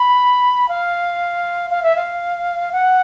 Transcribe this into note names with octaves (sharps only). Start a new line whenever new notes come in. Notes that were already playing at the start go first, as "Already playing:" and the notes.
Already playing: B5
F5
F5
E5
F5
F#5